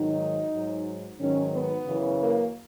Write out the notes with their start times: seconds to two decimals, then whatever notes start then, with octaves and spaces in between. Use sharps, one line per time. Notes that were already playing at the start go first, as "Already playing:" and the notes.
Already playing: G#2 D#3 F#3 D#4
0.52 G#2 F#3
1.19 G#2 D#3 F#3 C#4
1.52 B3
1.85 F#2 C#3 E3
2.19 A#3